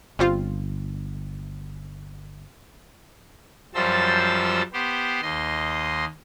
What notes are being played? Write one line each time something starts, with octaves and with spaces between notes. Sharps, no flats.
G1 G3 C4 F4
F#2 F3 G3 C5 A5 E6
B3 G4 C5
D#2 D#5 C6